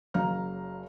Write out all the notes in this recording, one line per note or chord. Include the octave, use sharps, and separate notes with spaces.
F#1 F#3 F5 A#5 F6